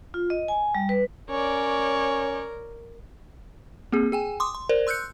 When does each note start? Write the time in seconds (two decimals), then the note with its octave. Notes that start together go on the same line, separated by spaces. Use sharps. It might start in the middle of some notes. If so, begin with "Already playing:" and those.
0.14 F4
0.30 D#5
0.48 G#5
0.75 G3
0.89 B4
1.30 C#4 A#4 C#5 D5
3.92 A#3 C4 G#4
4.12 G#4 G5 G#5
4.40 C6 D6 D#6
4.55 C6
4.69 A#4 C5 D5
4.87 C6 E6 F#6 G6 C#7